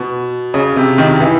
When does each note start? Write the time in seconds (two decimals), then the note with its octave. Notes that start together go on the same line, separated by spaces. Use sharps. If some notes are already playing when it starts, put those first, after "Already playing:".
Already playing: B2
0.54 C#3
0.76 C3
0.98 D#3
1.20 E3